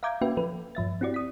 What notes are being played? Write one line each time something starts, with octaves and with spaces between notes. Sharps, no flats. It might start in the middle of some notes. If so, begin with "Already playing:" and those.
E5 F5 A#5 D6 G6 G#6
A#3 C#4 F#4 B4 E5 G5
F3 A4 B4
G2 F3 E5 A6
C4 E4 F#4 G4 D5
D#6 B6